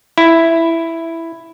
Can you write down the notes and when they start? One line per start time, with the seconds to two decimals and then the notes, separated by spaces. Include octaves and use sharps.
0.18 E4